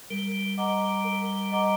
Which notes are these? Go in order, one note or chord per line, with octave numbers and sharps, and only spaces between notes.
G3 A#4
D#5 F#5 A#5 D6
A#4
D#5 F#5 A#5 D6